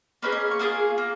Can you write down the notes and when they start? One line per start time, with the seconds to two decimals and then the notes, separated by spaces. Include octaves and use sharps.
0.23 A#3 C#4 G#4 B4
0.32 D#5
0.51 C#6
0.59 A#3 F4 G#4 D#6
0.98 A#3